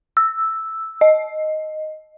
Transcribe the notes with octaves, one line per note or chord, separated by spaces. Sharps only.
E6
D#5